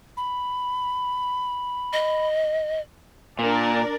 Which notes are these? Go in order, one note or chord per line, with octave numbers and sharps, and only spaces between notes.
B5
D#5
A#2 D4 A#4 D5